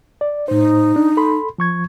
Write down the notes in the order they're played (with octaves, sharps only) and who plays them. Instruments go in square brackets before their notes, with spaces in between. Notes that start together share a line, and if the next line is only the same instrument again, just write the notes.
[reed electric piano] D5
[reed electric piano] A2 C5 [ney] D#4
[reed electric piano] D4
A4 B5 C6
F3 C#6 G#6